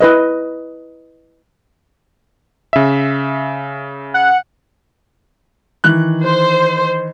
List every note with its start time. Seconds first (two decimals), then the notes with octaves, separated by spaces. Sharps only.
0.01 E4 B4 D#5
2.73 C#3 E5
4.14 F#5
5.84 D#3 E3 F#6
6.24 C5